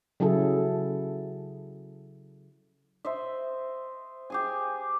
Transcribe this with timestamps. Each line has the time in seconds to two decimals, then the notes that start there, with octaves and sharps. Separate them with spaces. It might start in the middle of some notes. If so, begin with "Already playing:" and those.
0.20 C#3 F#3 E4 G#4 A4
3.05 C5 D#5 E5
4.30 G4 G#4 G#5